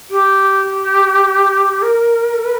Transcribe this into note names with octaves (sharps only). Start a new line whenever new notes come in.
G4
A#4